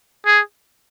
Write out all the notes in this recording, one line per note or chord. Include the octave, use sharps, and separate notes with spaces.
G#4